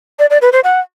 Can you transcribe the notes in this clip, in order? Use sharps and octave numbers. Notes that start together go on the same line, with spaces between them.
D5
D5
B4
C5
F#5